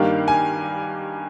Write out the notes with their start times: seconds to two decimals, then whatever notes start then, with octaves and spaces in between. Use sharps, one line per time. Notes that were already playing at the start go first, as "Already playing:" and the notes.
Already playing: G2 D#3 G3 A#3 F5
0.28 G#5